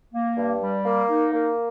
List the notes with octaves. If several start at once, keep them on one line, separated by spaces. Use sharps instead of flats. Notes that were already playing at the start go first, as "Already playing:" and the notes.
A#3
G2
G3
A#3
D#4
A#3